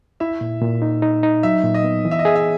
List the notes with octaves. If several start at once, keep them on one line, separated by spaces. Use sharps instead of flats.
E4 E5
A#2
A#2
D#4
D#4
D#4
F#3 E5
A#2
D#5
B3
E3
E5
D#5
G#4 E5
E5